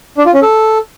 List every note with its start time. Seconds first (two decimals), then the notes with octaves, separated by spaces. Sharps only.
0.18 D4
0.26 F4
0.34 C#4
0.42 A4